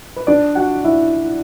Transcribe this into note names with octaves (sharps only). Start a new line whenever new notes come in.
B4
D4 D5
F#4 F#5
E4 E5